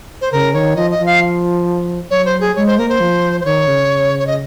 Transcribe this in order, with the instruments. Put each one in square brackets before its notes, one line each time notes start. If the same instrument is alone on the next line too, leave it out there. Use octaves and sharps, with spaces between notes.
[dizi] C5
[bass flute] C#3 [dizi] A#4
[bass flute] D#3 [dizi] C#5
[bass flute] F3 [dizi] D#5
[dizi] D#5
[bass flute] F3
[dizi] F5
[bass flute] F#3 [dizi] C#5
[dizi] C5
G#4
[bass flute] G#3 [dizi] C#5
[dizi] C5
[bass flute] A#3 [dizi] A#4
[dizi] C5
[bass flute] F3
[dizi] C5
[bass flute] D#3 [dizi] C#5
[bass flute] C#3
[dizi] C#5
D#5